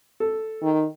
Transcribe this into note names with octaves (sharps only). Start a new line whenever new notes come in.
A4
D#3